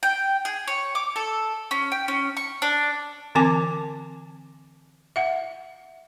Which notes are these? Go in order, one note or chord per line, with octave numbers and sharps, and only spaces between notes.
G5
G#4
C#5
D6
A4
C#4
G5
C#4
C#6
D4
D3 E3 C4 G#5 A5 D6
E5 F#5